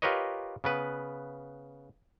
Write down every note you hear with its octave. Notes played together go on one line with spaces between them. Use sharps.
F4 G4 A#4 B4 C#5 D#5
C#3 B3 B4